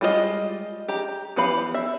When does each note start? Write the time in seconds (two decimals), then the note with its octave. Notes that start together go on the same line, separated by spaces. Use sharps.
0.01 G3 G#3 F4 G#4 D#5
0.88 G4 A#5
1.36 E3 B3 G4 F5 B5
1.74 E5